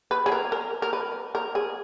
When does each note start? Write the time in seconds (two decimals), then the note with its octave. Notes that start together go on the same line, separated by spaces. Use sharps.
0.11 B4
0.26 G#4
0.32 A#4
0.52 A#4
0.82 A#4
0.93 B4
1.35 A#4
1.55 G#4